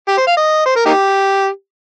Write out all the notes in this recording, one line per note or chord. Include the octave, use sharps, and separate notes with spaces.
G4
C5
F5
D#5
C5
A#4
A#3 D#4 G4